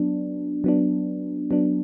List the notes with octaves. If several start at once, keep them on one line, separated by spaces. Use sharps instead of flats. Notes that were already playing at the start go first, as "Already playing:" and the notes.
Already playing: F#3 B3 D4
F#3 B3 D4
F#3 B3 D4